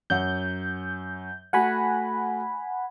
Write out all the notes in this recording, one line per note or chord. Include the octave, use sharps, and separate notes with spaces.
F#2 C#5 F#5 G6
A3 F#4 F#5 G#5 B5